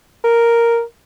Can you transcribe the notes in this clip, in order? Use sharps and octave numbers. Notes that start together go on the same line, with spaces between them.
A#4